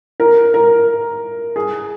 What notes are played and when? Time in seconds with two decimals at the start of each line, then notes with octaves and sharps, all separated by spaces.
0.20 A#4
0.54 A#4
1.56 G#4